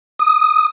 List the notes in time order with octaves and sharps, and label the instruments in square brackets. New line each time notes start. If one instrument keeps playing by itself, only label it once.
[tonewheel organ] D#6